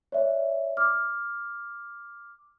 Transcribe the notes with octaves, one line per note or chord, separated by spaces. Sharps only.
C#5 D5 E5
D6 F6